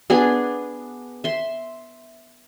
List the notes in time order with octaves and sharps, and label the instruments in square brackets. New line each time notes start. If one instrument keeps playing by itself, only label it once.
[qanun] B3 D4 G#4
E5 C6